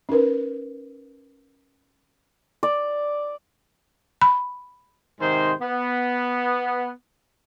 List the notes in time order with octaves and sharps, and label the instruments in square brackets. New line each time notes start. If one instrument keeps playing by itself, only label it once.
[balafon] C#4 D#4 A#4 B4
[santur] D5
[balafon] B5
[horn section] G#2 C3 D#3 G#3 C5
B3